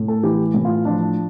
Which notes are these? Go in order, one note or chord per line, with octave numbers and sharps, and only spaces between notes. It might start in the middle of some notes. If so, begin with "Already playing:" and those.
Already playing: A2
A4
E3 G4
A2
F4
F3 D4